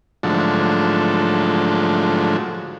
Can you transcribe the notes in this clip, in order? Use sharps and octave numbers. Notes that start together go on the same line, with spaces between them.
G#2 D3 F3 F#3 A3